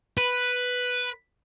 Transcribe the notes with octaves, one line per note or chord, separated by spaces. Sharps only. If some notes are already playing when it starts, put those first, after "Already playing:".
B4